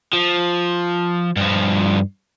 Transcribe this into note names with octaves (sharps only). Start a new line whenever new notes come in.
F3
G2 F3